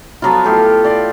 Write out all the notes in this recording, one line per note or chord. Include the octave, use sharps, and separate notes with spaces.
F3 F#3 B3 F4
A2 G4 A4 F5
D5 C6